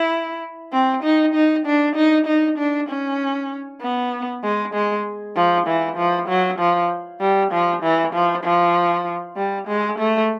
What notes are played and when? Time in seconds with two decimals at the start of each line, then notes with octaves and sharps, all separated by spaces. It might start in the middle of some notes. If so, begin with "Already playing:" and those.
Already playing: E4
0.73 C4
1.03 D#4
1.34 D#4
1.66 D4
1.96 D#4
2.27 D#4
2.58 D4
2.89 C#4
3.82 B3
4.43 G#3
4.74 G#3
5.36 F3
5.67 E3
5.97 F3
6.29 F#3
6.59 F3
7.21 G3
7.52 F3
7.83 E3
8.14 F3
8.44 F3
9.36 G3
9.68 G#3
9.99 A3